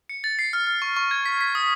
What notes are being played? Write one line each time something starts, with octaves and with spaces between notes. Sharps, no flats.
C#7
A6
C7
F6
F6
C#6
C#6
G#6
B6
B6
D#6